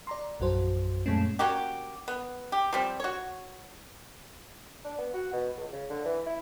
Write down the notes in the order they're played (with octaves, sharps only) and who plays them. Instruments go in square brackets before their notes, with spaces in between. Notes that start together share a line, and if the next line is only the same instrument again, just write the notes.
[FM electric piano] D5 A#5 C6
A#1 F#2 F#4 C5
F#2 A#2 G#3 A3 C#4
[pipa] A#3 C#4 F#4 G4
B3
G4
F3 G3 C4
F#4 C#5
[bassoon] D4
B3
F#4
B2
C#2
C#3
D3
E3
E4